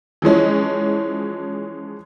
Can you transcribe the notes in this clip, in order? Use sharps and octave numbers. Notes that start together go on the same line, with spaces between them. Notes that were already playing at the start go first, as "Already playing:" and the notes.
E3 F3 G#3 C#4